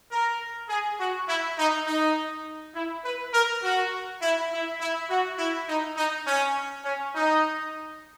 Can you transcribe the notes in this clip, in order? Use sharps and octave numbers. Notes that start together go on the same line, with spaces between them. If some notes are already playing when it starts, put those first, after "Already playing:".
A#4
G#4
F#4
E4
D#4
D#4
E4
B4
A#4
F#4
E4
E4
E4
F#4
E4
D#4
D#4
C#4
C#4
D#4